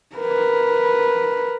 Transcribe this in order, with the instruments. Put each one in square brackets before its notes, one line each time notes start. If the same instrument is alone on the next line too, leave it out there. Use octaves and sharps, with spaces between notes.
[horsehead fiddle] A#4 B4